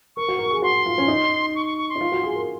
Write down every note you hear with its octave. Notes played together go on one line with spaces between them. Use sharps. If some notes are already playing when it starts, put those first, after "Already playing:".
A#4 C#6
F#4
A#4
G#4
F#4 C6
F4
C#4
D#4
C#6
C#6
C#6
C6
D#4
F4
F#4
G#4
A#4